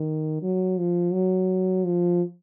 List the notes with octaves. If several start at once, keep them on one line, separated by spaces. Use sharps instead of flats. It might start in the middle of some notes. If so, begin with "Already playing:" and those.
Already playing: D#3
F#3
F3
F#3
F3